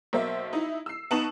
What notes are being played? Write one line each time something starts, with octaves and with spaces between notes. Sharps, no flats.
B1 A#3 C5 E5
D#4 E4
E6 C7
B3 D#4 A5 C#6 E7 F#7